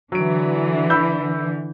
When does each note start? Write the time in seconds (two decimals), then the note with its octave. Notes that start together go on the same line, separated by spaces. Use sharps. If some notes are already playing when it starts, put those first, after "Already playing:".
0.12 D3 E3 F#3 D7
0.90 B5 E6 G6